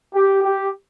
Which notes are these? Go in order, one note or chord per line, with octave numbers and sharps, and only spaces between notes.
G4
G4